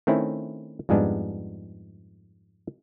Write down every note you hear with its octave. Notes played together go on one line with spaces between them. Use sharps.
D#3 A3 C4 C#4 E4
F2 G#2 G3 G#3 B3 D4